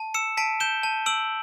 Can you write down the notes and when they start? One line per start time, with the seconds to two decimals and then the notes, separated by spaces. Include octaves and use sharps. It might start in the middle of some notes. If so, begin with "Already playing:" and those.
Already playing: A5
0.14 E6 C#7 E7
0.37 A5 B6 D7
0.60 G6 E7 G7
0.83 A5
1.06 E6 D7 F#7